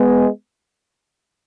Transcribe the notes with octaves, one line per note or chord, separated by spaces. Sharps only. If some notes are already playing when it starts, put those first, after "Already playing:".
Already playing: G#3 B3